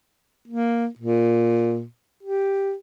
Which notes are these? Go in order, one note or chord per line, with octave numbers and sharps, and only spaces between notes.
A#3
A#2
G4